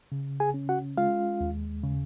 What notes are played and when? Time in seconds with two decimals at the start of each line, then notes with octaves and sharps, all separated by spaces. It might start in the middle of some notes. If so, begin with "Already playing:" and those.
0.12 C#3
0.40 G#4 G#5
0.54 C#4
0.69 F#4 F#5
0.97 G#3 F4 F5
1.41 D#2
1.83 C#3